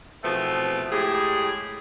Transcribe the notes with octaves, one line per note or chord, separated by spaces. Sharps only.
E2 B2 F3 A3 B3 C4
A2 G#3 G4 G#4